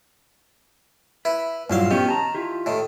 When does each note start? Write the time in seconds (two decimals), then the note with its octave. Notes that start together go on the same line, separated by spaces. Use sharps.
1.25 E4 B4
1.70 A#1 G2 F#3 E4 F4 F5
1.91 D#3 B3 C#4 G4
2.09 A5 A#5
2.35 E4 F4 G4
2.66 A2 D#3